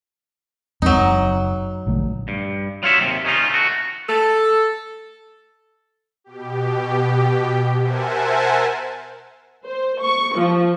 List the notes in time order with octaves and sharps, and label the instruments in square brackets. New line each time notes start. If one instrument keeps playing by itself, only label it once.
[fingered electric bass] E2 G#3 C4 [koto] F#3 D#4
[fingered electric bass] F#1
A#1 D3 A3
[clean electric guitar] G2
F#3 F4 C#5 E5
D#2 C3
D#3 C#4 D#4 F4
A3 F#4
[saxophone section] A4
[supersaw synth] B2 G4
A#4 C5 E5 F#5 G#5 A5
[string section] C5
C#6
F3